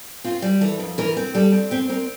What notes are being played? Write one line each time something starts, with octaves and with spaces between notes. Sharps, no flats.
C4 F4
G3
E3 A4
F2
E3 A#4
C4
G3 A4
C4
C4 G4
C4 A#4